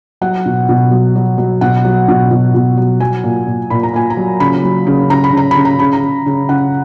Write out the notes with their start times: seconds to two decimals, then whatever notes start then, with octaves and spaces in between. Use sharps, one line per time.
0.21 F#3 F#5
0.46 B2
0.69 B2
0.91 F#3
1.15 F#3
1.38 F#3
1.61 B2 F#5
1.85 F#3
2.08 B2
2.31 B2
2.54 B2
2.77 F#3
3.00 F#3 G#5
3.24 A#2
3.47 A#2
3.70 A#2 B5
3.83 A#5
3.93 A#2 G#5
4.10 A#5
4.17 F#3
4.40 C#3 B5
4.64 F#3
4.87 C#3
5.10 C#3 A#5
5.24 B5
5.33 C#3 A#5
5.51 B5
5.56 C#3
5.65 A#5
5.79 C#3 B5
5.93 A#5
6.03 C#3
6.26 C#3
6.49 C#3 F#5